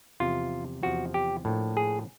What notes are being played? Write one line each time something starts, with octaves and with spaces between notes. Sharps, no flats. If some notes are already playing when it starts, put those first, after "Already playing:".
E2 C3 F3 F4
E2 C3 F3 F#4
G4
A2 F3 A#3 D4
G#4